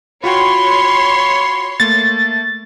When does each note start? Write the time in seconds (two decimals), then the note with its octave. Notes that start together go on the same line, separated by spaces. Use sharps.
0.24 F4 F#4 C#5 G5 B5 C6
1.80 A3 A#3 A6